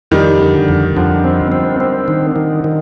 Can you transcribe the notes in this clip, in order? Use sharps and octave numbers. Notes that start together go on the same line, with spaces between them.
F2 D#3 G3
D3
F2
F2 D3 F3
C4
C4
C4
D#3
D#3
D#3